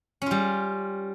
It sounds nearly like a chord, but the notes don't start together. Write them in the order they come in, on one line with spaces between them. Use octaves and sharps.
C#4 F4 G3